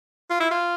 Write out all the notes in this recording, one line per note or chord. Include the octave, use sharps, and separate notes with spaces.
F4
E4
F4